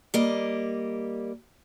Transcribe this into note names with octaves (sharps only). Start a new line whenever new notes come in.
G3 A#3 D#5